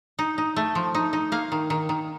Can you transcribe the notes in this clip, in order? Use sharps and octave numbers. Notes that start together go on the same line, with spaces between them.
D#4
D#4
A3
F3
D#4
D#4
A#3 F5
D#3
D#3
D#3